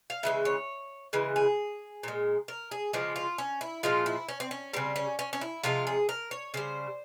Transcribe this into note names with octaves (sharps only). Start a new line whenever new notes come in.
F5
C#3 E3 G#3 E5
C#5
C#3 E3 G#3
G#4
A#2 G#3
A#4
G#4
C#3 F3 G#3 G4
F4
C#4
E4
A#2 F3 G#3 F4
E4
C#4
C4
C#4
C#3 G3 C4
C#4
C#4
C#4
E4
C3 F3 G#3 F4
G#4
A#4
C#5
C#3 G3 C5